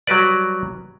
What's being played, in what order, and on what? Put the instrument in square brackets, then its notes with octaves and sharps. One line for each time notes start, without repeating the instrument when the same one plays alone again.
[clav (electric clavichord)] F#3 G3 F#4 B4 D5